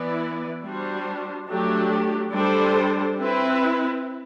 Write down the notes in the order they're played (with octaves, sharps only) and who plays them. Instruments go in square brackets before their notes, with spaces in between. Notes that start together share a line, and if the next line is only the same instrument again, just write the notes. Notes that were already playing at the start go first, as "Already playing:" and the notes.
Already playing: [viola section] E3 B3 E4 B4 D5
G3 D4 F#4 C5
F#3 A3 D4 G4
G3 D4 A4 C5
C4 E4 B4